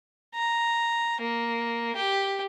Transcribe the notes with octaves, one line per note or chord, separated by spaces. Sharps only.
A#5
A#3
G4